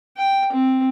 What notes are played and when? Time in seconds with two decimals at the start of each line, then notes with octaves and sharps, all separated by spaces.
0.17 G5
0.52 C4